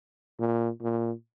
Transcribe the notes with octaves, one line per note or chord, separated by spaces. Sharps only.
A#2
A#2